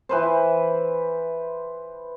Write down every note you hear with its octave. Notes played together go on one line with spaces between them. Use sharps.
E3 B4 C5